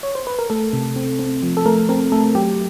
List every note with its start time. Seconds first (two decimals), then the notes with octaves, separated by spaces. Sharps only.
0.03 C#5
0.15 C5
0.27 B4
0.39 A#4
0.50 A3 A4
0.73 C3
0.96 C4
1.19 C4
1.43 F3
1.57 A4
1.65 A3 A#4
1.89 C4 A#4
2.12 A3 A4
2.35 F#3 G4